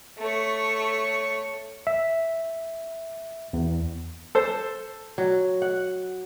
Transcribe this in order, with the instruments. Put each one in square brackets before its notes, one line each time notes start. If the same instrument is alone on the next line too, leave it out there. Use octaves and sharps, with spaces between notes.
[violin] A3 C#5
[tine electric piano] E5
E2
[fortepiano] A4 C5
[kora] F#3
F#5